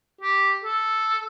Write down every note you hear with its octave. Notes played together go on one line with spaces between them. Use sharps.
G4
A4